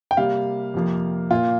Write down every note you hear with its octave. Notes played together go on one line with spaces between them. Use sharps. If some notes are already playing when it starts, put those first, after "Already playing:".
G5
C3 G3 A#3 F5
F2 C3 F3 A#3
A#2 A#3 F4